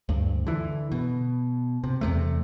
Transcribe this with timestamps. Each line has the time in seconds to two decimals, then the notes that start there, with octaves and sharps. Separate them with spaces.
0.09 D2 G2
0.47 D3 E3
0.92 B2
1.84 C3
2.01 E2 C3 A3